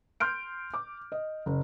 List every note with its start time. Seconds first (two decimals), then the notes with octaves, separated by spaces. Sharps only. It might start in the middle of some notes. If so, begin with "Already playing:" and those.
0.20 C6 F6 G6 D7
0.74 D6
1.12 D#5
1.46 F#1